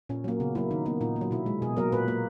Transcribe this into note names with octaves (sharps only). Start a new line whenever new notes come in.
A#2 C#4
F#3 A#3
C#3 B3
F#3 A#3 E4
D#3 D#4
A#3 B3
A#2 D#4
A#3
F#3
B2 E4
G#3
B2 G#4
F#3 A#3 A#4
A#2 B4
A#3